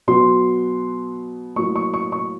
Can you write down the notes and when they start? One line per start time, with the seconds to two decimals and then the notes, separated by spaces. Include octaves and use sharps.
0.08 B2 F#3 B3 C6
1.56 A2 F#3 A#3 C#6
1.76 C#6
1.94 C#6
2.12 C#6